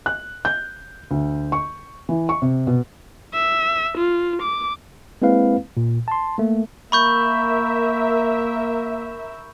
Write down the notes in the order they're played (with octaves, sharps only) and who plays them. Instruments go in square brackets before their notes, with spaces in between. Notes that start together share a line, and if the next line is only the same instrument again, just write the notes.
[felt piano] F#6
G6
D2
C#6
E3
C#6
C3
B2
[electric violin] E5
F4
D6
[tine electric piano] G#3 A#3 C4 E4 B4 F5
A#2
A5 C6
A3 A#3
[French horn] A#3 [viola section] A#4 E5 [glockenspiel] B5 C#6 G6